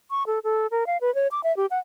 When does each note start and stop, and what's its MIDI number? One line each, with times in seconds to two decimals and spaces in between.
0.10 0.23 85
0.27 0.39 69
0.44 0.67 69
0.71 0.86 70
0.87 0.97 77
1.01 1.13 71
1.15 1.28 73
1.31 1.41 86
1.44 1.55 76
1.57 1.66 67
1.71 1.79 78